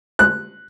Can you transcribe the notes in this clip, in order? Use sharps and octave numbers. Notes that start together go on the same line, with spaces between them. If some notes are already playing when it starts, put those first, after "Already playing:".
F#6